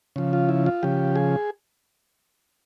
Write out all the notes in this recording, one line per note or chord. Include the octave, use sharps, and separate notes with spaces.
C#3 F3
F4
E4
F4
C#3 F3 G4
G#4